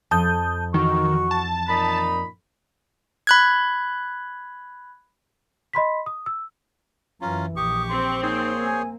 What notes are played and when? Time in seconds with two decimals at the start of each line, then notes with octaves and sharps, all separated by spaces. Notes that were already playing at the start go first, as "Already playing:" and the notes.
0.11 F2 A5 D#6 G6
0.74 D#3 E3 F#4 C#6
1.31 A5
1.68 A#2 D#4 B5
3.27 B5 F#6 G#6
5.73 D#5 B5 C6 B6
6.06 D#6
6.26 E6
7.21 F#2 E3 C#4 F4 A#5
7.57 A#1 G4 C#6 D#6
7.89 C4 C6
8.22 A#3 D#4 G#4 C5 C#5
8.65 G#5